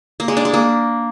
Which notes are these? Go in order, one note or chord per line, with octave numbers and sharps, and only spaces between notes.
A#3
G#3
D4
G#3
A#3